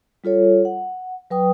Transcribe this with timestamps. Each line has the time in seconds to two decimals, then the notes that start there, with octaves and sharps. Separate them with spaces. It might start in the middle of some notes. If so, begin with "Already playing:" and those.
0.24 G3 F4 A4 C#5
0.65 F#5
1.30 F#3 B4 G5 D#6